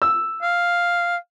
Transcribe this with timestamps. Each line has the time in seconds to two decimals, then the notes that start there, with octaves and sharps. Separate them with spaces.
0.02 E6
0.42 F5